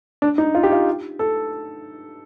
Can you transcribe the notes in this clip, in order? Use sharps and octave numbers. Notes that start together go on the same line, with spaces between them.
D4
D#4
F4
G4
F4
A4